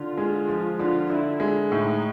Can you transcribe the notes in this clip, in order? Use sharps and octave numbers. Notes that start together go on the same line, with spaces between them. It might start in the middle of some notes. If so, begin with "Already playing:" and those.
Already playing: D3 F4
G#3
F3
D3 F4
D3 E4
G#3
A2 D#4